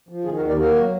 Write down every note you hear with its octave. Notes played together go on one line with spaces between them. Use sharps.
F3
D#3 F4 G#4
F#4 A#4
D#2
A#4 D5
A#3 F#4 A#4
F#3